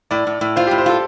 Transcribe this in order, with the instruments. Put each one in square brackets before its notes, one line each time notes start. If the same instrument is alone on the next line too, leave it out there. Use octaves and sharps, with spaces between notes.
[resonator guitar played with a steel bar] A2 [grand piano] D5
[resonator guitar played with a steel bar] A2
A2
[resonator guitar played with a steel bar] F4 [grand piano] C5
[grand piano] G4
[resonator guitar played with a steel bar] A2
[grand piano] C5
[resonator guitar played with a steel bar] F4 [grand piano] A4